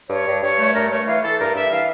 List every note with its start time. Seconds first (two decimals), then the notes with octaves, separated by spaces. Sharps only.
0.09 G2 C#5
0.26 G2
0.42 G2 C#5
0.59 A3
0.74 G2 A#4
0.90 A3 C#5
1.07 E3 F5
1.23 E3 A4
1.39 G2 A#4
1.55 G2 E5
1.71 E3 F5